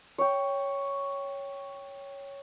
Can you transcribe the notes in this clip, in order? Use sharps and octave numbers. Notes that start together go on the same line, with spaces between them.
C#5 G5